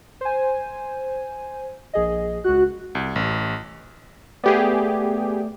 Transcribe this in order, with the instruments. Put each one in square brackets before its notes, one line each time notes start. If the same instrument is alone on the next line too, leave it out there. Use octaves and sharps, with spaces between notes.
[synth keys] C5 G#5
A#1 G#4 D#5
[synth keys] C#2 F#6 [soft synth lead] F#4
[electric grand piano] C2
A1
[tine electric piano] A3 D5 [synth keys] B3 G4 G#4